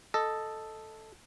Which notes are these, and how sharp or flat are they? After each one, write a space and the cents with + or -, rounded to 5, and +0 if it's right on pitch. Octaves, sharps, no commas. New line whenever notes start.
A4 +0 D#5 +0